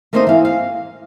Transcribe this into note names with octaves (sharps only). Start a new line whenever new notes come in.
A3 A#3 C4 D#4 C5 D#5
E3 F5
F5